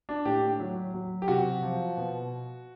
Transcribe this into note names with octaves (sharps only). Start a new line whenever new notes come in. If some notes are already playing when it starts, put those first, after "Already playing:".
D4
A2 G4
F#3
F#3
G4
C3 F#4
F3
B2